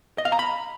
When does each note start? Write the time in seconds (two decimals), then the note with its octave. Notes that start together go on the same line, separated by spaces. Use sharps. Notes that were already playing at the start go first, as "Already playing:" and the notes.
0.18 D#5
0.25 F5
0.32 A#5
0.39 B5